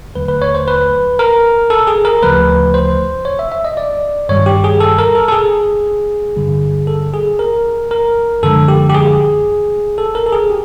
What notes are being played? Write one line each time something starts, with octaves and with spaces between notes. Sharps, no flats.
D#2 D3 F#3 A3 B4
B4
C#5
C5
B4
A#4
A4
G#4
A#4
D2 C#3 F3 A3 B4
C5
C#5
E5
E5
D#5
D5
G2 D#3 G3 C#5
G4
G#4
A4
A#4
A4
A4
G#4
G2 D3 G3
A4
G#4
A#4
A#4
F#2 D3 F3 G#3 A4
G4
G4
G#4
A4
A#4
A4
G#4
G4